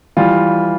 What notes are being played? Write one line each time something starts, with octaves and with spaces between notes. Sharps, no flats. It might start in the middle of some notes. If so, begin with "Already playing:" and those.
E3 G3 F4